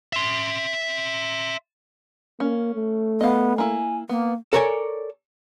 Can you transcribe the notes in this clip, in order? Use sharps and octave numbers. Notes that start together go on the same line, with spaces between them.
E5 C6
A#3 C#4
A3
B3 D#5 F5
A#3 E4 G#5
A#3 B3
A4 A#4 C#5 D5 G#5